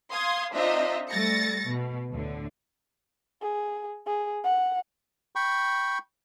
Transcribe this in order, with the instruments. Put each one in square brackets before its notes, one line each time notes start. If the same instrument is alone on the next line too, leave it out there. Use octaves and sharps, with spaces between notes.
[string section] F5 C6 D#6 G#6
C4 D4 D#4 F4 D#5 E5
G3 A3 A6 A#6 C#7
B2
D2 A2 D3
[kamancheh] G#4
G#4
F#5
[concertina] G5 B5 C#6